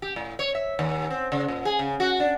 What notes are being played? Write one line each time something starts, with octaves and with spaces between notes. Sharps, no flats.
G4
A2
C#5
E5
D#2
C4
C#3
A#2
G#4
C#3
F#4
D4